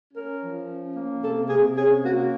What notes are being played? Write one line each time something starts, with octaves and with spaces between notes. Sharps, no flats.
C#4 A#4
F3
C#4
A#3
C3 A4
C3 G#4
C#4 G#4
A#3 F#4